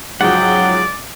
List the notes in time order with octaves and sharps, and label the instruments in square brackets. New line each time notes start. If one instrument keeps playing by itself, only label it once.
[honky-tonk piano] G#2 C#3 F3 [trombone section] F#3 [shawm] D5 [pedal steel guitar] F#5 G5